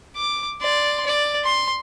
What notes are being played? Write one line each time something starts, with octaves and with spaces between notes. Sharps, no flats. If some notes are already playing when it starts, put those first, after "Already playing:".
D6
D5 C6
D5
C6